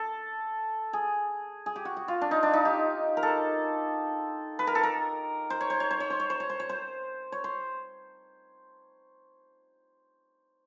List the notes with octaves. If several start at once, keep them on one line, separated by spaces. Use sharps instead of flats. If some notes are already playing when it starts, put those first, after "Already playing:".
Already playing: A4
G#4
G#4
G4
F#4
F#4
F4
D4
D#4
D4
D#4
G4
A#4
A4
B4
A#4
A4
A#4
C5
C#5
C5
C#5
C5
C#5
C5
C#5
C5
C#5
C5
C#5
C5
C#5
C5